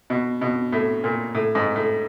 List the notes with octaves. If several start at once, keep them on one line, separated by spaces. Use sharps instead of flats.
B2
B2
A2
A#2
A2
G#2
A2